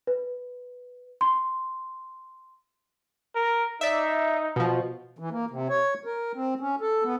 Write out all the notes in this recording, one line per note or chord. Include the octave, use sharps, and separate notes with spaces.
B4
C6
A#4
D#4 D5 E5
B2 F3
E3
A#3
C3
C#5
A#4
C4
C#4
A4
B3